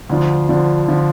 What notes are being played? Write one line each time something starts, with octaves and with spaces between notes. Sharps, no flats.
D2 D3 F3
D2 D3 F3
D3 F3